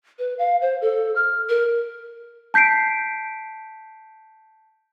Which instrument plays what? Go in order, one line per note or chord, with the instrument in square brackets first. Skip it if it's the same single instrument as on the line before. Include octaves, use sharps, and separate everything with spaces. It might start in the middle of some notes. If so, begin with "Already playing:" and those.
[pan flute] B4
F5
C5
A4
F6
A#4
[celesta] A5 G6 B6 C7 D7